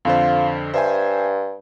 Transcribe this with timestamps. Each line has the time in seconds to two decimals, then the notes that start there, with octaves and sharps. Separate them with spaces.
0.05 F2 D3 F4 C5
0.74 G2 C5 E5 G#5